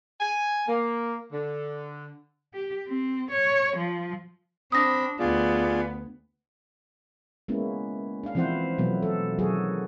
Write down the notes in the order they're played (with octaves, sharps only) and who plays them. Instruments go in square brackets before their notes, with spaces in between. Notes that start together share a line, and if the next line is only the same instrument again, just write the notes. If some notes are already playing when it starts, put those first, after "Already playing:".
[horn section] G#5
A#3
D3
[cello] G4
C4
C#5
F3
[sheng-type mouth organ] C4 B5 [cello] D4 [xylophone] D#6 A#6
[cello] D2 B3 [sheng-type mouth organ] F4 G#4 D5
[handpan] G#3 A#3 B3 C#4 E4
D4 F5
E3 F3 C4 E4 C5 F#5
B2 E3 F#3 A3 B3
A4
D#3 F#3 F#4 G#4 A4